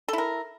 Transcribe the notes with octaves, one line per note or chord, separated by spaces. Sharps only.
E4 A4 A#4